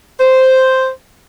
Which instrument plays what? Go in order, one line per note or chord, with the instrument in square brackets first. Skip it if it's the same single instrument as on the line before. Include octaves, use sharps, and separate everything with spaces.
[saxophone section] C5